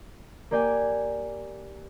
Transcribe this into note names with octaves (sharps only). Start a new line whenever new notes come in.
A#3 G4 D5 G5 G#5